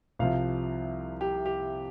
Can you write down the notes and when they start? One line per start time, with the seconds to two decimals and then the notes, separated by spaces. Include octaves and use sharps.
0.19 C2 C3 F3 F5
1.21 G4
1.46 G4